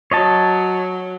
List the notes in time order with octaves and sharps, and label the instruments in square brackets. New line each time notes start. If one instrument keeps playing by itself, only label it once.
[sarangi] F#3 [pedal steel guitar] C#5 D#5 A5